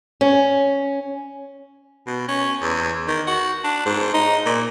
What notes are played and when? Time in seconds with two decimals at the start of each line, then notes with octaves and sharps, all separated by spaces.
0.21 C#4
2.07 B2
2.28 C#4
2.62 E2
3.08 D#3
3.27 F#4
3.64 D4
3.86 G#2
4.14 D#4
4.46 A#2